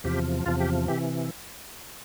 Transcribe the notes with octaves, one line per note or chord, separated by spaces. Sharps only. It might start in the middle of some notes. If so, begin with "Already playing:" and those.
E2 C3 F3 G4
E2 C3 F3 F4
G4
C3 E3 G4